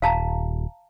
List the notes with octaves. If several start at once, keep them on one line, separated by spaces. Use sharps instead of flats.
D#1 F5 A5 A#5